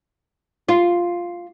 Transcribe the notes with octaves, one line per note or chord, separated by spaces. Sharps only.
F4